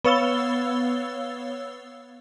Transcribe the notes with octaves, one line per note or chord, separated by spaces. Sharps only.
B3 C#5 F5 E6 A6 G7